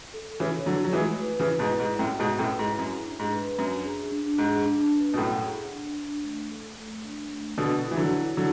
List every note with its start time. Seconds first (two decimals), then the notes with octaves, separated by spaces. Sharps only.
0.14 A4
0.40 C#3 E3 C#5
0.66 D3 F#3 E4
0.85 F#3
0.93 E3 G#3 A3
1.20 B4
1.39 C#3 E3
1.46 E4
1.59 G#2 B2
1.73 D5
1.79 G#2
1.99 F#2 A2 F#5
2.19 G#2 B2
2.26 B4
2.39 F#2 A2
2.53 E4
2.59 G#2
2.79 F#2 G#4
3.05 D4
3.19 G#2
3.33 B4
3.58 F#2 D4
3.85 G#4
4.12 D4
4.38 G#2 G#4
4.65 D4
4.92 B4
5.14 B2
5.18 F#2 A2 F#5
5.45 G#4
5.71 D4
5.98 D4
6.24 A3
6.51 A4
6.78 A3
7.04 D4
7.30 A3
7.57 B2 D3 B4
7.84 E4
7.91 E3
7.97 D3 F#3
8.10 F#5
8.37 D3 F#3 E4